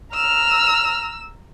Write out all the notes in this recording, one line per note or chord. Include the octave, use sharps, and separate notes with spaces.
A#5 E6 F6